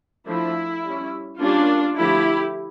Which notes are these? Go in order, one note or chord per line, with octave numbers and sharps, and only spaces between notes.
F3 A3 D4 E4
G3 C#4
G3 A#3 C#4 D4 F4
D3 F3 A3 E4 G4